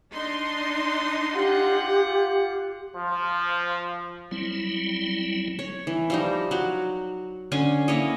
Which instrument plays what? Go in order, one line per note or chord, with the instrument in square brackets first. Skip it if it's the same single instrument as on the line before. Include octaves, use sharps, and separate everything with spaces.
[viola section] D4 D#4 C6
[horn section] F4 F#5 [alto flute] G4
[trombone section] F3
[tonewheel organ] F#3 G3 C4 E4
[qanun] C#5
E3
F3 G3 D#4
F#3 F#4
D3 C#4 G#5 C6
A#3 E4 C#5 D#5